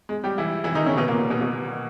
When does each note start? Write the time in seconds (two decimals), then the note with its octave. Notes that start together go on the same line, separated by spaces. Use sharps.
0.09 G#3
0.24 G3 G4
0.38 E3 E4
0.64 E3 E4
0.75 D#3 D#4
0.86 C#3 C#4
0.97 B2 B3
1.08 A#2 A#3
1.30 B2 B3
1.41 B2 B3